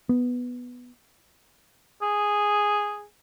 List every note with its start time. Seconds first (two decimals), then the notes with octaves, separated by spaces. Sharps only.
0.09 B3
2.02 G#4